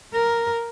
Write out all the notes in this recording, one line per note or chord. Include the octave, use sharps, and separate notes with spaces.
A#4